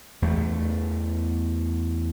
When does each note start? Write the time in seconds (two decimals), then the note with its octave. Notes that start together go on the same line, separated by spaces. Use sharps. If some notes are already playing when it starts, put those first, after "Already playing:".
0.22 E2 A3